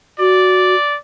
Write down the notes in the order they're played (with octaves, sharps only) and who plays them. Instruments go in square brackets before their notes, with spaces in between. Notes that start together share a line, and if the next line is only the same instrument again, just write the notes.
[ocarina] F#4 [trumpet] D5